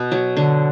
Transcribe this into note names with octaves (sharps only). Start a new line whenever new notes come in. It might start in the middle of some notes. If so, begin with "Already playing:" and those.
Already playing: B2 B3
F#3
D3